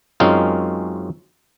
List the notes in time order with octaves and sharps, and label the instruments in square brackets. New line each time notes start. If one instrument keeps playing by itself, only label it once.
[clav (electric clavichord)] F#2 G#3 C4 C#4 D#4 F4